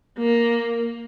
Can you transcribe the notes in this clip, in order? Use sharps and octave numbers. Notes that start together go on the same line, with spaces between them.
A#3